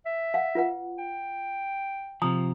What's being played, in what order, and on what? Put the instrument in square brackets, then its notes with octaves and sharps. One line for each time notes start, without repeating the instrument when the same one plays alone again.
[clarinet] E5
[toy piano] F5 F#5
F4 B4 F#5
[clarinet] G5
[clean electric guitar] C3 F3 [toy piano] A#5 D#6